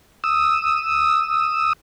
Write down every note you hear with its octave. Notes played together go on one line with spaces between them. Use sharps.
D#6 E6